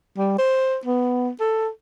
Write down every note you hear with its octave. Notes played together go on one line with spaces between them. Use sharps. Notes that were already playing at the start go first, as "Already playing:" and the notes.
G3
C5
B3
A4